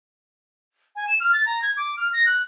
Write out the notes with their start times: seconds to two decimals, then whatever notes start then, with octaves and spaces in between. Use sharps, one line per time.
0.96 G#5
1.07 E7
1.20 F6
1.33 A6
1.46 A#5
1.62 G#6
1.77 D6
1.97 F6
2.13 A#6
2.26 F#6